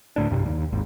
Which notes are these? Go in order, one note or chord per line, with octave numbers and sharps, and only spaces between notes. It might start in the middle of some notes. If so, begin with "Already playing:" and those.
D2 A2 D4
B1 G2 C3
D#2
G#1 D#2 G#2